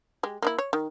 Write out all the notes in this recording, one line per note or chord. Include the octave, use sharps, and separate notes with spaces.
G#3 G4
A#3 D#4 E4
C#5
D#3